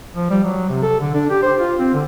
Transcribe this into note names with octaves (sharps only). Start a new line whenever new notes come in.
F3
G3
F#3
C3
A4
D3
D4
G4
C5
F4
C4
D3